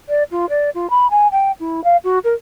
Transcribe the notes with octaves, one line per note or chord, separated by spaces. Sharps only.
D5
F4
D5
F4
B5
G#5
G5
E4
F5
F#4
A#4